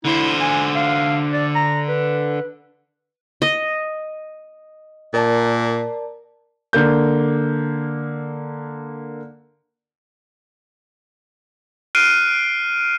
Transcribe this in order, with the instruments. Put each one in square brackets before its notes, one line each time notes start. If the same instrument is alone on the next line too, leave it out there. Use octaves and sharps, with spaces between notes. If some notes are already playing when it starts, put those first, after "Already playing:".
[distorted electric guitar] D3 C5 [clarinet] E4
[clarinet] G#5
F5
D5
A#5
B4
[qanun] D#5
[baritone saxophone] A#2 [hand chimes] A#4 D5 A5
[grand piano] D3 A#3 G6
[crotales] F6 F#6 C7 D7 D#7